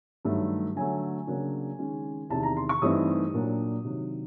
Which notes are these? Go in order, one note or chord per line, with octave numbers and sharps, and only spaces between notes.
G2 D#3 F#3 A3
D3 F#3 A3 G#5
C#3 F#3 A#3 D4
D#3 G#3 C#4
E2 C3 D#3 A5
A#5
C6
C#6
G2 E3 A3 C4 D#4 D#6
A#2 F#3 A#3 D4
C3 D#3 F#3